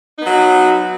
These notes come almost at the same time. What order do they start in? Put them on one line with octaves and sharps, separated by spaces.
D#4 B3 F#3